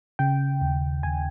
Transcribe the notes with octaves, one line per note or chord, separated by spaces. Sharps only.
C#3 G5
D#2
D#2 G#5